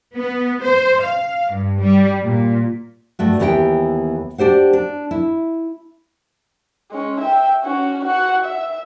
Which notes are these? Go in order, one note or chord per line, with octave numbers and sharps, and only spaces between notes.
B3
C5
F5
G2
G3
A#2
G2 A3 F#4
D#2 E3 B3 G4 C5 G5
D4 G4 C5 F#5
D4
E4
G#3 C#4
E5 G5
C#4 F#4
F#4 F#5
E5